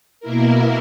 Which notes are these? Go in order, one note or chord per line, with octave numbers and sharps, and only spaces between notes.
B2 A#3 E4 A#4